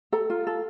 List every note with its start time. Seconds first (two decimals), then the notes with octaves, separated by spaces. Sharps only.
0.13 A4 A#5
0.30 F4
0.47 A4